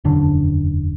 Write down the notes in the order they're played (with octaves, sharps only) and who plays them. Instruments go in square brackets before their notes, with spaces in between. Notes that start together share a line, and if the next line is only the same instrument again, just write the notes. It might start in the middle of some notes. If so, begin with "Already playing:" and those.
[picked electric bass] E1 F#2 D3 D4